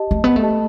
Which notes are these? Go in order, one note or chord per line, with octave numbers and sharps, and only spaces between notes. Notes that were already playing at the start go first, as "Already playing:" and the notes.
Already playing: G4 D#5 A5
A3
B3
A3
G4 D#5 A5